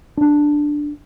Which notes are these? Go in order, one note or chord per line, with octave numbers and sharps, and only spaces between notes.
D4